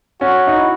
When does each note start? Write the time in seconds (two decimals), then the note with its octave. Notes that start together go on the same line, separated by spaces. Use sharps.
0.21 C#4 F#4
0.47 D#4
0.57 E4